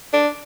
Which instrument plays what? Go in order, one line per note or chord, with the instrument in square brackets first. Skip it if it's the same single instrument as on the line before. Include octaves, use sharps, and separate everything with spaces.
[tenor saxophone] D4